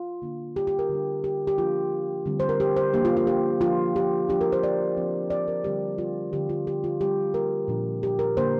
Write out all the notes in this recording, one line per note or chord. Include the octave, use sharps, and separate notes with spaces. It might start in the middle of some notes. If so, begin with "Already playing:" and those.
Already playing: F4
D3 A#3 D4
G4
G4
A#4
D3 G3 D4
G4
G4
F3 A#3 D4 F4
D3 G3 C4
C5
A#4
G4
C5
F3 A#3 D4 G4
F4
F4
G4
F3 D4 F4
G4
F3 D4 G4
A#4
C5
D5
F3 C4
D5
A#4
D3 G3 C4 G4
F4
D3 F3 C4 G4
F4
G4
F4
D3 G3 C4 G4
A#4
A#2 F3 D4
G4
A#4
D3 A#3 D4 C5